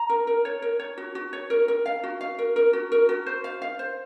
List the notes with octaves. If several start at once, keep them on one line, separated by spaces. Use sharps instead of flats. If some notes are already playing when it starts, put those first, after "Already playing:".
Already playing: A#5
A#4
A#4
C#5
A#4
C#5
F#4
F#4
C#5
A#4
A#4
F5
F#4
F5
A#4
A#4
F#4
A#4
F#4
C5
F5
F5
C5